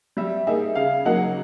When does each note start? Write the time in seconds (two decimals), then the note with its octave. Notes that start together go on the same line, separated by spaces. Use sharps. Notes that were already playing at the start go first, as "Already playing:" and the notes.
0.17 G3 E5
0.47 A#3 D#4 G#4 E5
0.75 C#3 F5
1.05 F#3 A#3 D#4 F#5